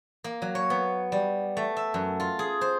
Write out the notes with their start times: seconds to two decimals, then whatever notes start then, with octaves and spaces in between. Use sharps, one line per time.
0.24 A#3
0.42 F#3
0.55 C#5
0.70 B3
1.12 G3
1.57 A3
1.77 E5
1.94 F#2
2.20 F4
2.39 G#4
2.61 C5